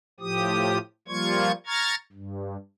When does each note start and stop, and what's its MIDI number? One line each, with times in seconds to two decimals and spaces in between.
0.20 0.78 45
0.20 0.78 53
0.20 0.78 67
0.20 0.78 87
1.08 1.52 53
1.08 1.52 55
1.08 1.52 58
1.08 1.52 65
1.08 1.52 85
1.08 1.52 92
1.66 1.95 82
1.66 1.95 85
1.66 1.95 89
1.66 1.95 92
1.66 1.95 93
2.12 2.57 43